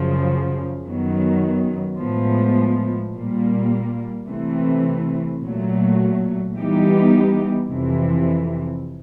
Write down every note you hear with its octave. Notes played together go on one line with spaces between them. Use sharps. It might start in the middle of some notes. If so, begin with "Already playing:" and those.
Already playing: F#2 C#3 F3
F#2 D#3 F#3 B3
A2 F3 G#3 B3
A#2 G3 A#3
C3 E3 A3 C4
A#2 F#3 A3
E3 G3 B3 D#4 G4
F2 C3 E3